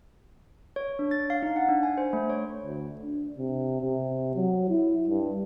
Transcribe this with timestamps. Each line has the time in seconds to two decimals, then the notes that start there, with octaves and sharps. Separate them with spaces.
0.76 C#5
0.99 D4
1.11 A6
1.30 F5
1.42 D#4
1.56 F#5
1.69 D4
1.83 G#5
1.98 C5
2.13 A3
2.30 C#5
2.63 D2
3.01 D4
3.38 C3
3.82 C3
4.35 F#3
4.69 E4
5.08 G2